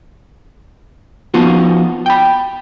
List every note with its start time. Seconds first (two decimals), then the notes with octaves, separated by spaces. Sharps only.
1.34 F3 B3 D#4 F4 F#4
2.06 G5 B5